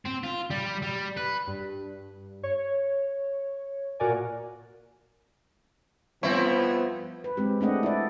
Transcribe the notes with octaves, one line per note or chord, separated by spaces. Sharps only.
C4
F4
G3
G3
B4
G2
C#5
A#2 F#4 A#4 D5 G#5
G2 F3 A3 B3 C4 E4 C#5
B4
G#3 C4 G4
A3 C4 D4 G4 D#5 F#5
E4 D5